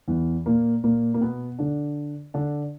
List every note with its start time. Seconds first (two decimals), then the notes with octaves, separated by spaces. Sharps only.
0.08 E2 E3
0.46 A#2 A#3
0.84 A#2 A#3
1.14 A#3
1.21 B2 B3
1.59 D3 D4
2.34 D3 D4